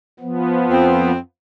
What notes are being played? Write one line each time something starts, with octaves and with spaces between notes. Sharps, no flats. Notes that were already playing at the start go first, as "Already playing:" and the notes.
F3 B3
F2 C4